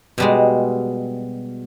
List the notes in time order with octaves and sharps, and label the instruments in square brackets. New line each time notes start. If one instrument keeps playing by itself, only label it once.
[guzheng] B2 G3 G#3